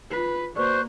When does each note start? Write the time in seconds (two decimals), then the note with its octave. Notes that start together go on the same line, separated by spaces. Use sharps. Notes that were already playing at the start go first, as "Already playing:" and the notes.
0.11 F4 B4 B6 C7
0.56 A#3 F#4 B4 C5 D5 C#6 F#6